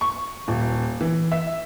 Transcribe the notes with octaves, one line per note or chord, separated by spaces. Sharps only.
C#6
D#1
E3
E5